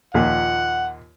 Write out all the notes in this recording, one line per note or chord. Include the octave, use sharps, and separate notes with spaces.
D#2 A#2 F3 F#5